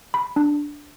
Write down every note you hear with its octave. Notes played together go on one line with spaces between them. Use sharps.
B5
D4